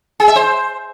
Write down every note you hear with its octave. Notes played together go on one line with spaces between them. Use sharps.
G#4
E5
C5